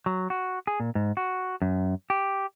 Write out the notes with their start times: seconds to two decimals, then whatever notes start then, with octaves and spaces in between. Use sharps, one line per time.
0.06 F#3
0.30 F#4
0.67 G#4
0.80 A#2
0.95 G#2
1.17 F#4
1.62 F#2
2.10 G4